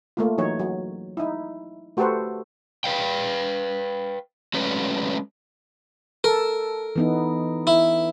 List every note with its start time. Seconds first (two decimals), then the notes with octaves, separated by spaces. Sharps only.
0.17 A3 A#3 F4
0.38 E3 F#3 D#4 C#5
0.59 F#3
1.17 D#4 E4
1.97 A3 F#4 G4 A4 B4 C5
2.84 B4 F5 G5
4.54 F#3 G#3 A3 C#4 B4
6.24 A4 A#4
6.96 E3 B3 D#4
7.67 E4